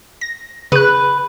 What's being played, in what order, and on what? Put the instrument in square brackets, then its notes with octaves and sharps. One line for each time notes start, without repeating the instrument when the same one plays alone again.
[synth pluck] A#6
[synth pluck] C#3 F#6 [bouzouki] B4